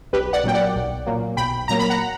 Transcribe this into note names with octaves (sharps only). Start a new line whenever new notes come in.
B1 G4 B4
D5 F#5
A#2 F#3 A#3 G5
D5 F#5
B1
A#2 F#3 A#3
B1 G5 B5
A#2 F#3 A#3 A#5
B5
F#5 A#5